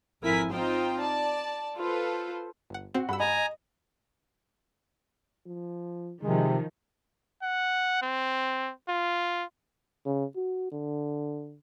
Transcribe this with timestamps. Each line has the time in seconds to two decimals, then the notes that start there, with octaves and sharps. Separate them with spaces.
0.23 G#1 F2 E4 A#4 G#5 B6
0.53 C4 D#4 F4 C5 G5
1.00 D5 A5
1.76 F4 A4 B4 C5
2.70 G1 F#5
2.94 C4 F#4
3.09 G2 F#5 B5 E6
3.20 D#5 G#5 A#5
5.46 F3
6.22 C3 D#3 F3 G#3
7.43 F#5
8.02 C4
8.89 F4
10.06 C#3
10.36 F#4
10.72 D3